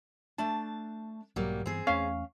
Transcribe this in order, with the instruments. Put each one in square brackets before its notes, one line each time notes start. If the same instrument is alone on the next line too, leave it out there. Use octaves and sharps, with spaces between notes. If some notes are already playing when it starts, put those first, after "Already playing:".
[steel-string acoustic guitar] A3 D4 A5
[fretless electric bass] B1 G#2 [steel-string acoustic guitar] F#3 G3 A#3
[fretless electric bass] G2 E3 B3 [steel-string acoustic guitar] C4 G#4
[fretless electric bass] E2 A3 [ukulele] C#4 F5